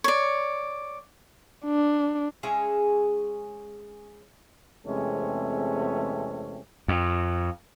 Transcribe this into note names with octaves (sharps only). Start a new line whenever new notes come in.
C#5 D5
D4
G#3 C#4 G#4 E5
E2 C3 G#3 A3 C4 C#4
F2